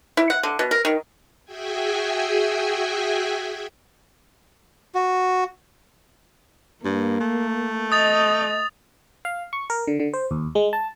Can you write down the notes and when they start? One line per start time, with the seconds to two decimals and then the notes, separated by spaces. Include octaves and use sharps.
0.17 E4
0.30 F#5
0.43 D3
0.59 B2
0.71 A#4
0.85 D#3
1.45 F#4 G#4 E5 G5 G#5
4.95 F#4
6.85 G2 A#3
7.20 A3
7.92 D#5 D#6 A6 F7
9.25 F5
9.53 C#6
9.70 A#4
9.87 D3
10.00 D3
10.13 C5
10.31 D#2
10.55 G#3
10.73 A5